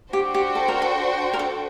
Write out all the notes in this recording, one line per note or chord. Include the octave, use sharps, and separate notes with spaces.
D4 F#4 G4 C5 G5
G4
A4
A#4
A4
A#4
A4